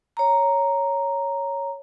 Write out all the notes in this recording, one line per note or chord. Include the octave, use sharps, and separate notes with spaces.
C#5 A#5